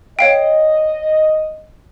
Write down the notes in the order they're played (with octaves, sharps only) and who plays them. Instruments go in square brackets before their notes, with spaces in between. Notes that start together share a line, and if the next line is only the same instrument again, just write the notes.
[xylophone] C#5 F5 G5 [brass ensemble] D#5